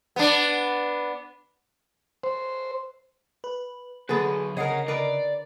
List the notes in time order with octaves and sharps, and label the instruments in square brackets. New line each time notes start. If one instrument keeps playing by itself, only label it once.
[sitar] B3 D4
[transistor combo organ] C5
[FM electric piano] B4
[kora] D3 B3 [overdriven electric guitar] F#3 B4 [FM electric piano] G#4
[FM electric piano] C#3 D#5 C7 [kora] G#4 A#4 [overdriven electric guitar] C#5 F#5
[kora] A#4 B4 [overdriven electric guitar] D5